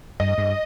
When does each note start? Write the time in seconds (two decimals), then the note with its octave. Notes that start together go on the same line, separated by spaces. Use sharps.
0.20 G2 D#5
0.38 G2